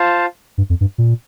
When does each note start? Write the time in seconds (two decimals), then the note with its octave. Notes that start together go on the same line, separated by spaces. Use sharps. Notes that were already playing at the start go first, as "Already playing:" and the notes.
Already playing: F4 C5 F5 A5
0.58 G2
0.70 F2
0.81 G2
0.98 A#2